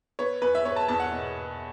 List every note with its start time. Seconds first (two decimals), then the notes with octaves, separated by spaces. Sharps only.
0.19 B3 C#5
0.42 E2 B4
0.55 E5
0.65 B3 C#5
0.76 A5
0.88 E2 A5
1.00 F#5
1.12 B2